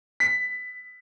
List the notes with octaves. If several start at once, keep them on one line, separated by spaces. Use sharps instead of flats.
B6